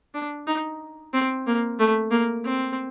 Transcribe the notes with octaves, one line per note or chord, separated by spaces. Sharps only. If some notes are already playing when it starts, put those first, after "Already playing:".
D4
D#4
C4
A#3
A3
A#3
C4